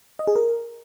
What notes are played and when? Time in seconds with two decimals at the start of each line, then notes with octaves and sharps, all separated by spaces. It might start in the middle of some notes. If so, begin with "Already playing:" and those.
0.19 D#5
0.27 G#4
0.36 A#4